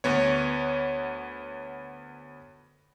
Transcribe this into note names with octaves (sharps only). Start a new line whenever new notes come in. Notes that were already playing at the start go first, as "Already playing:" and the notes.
D2 B3 C#5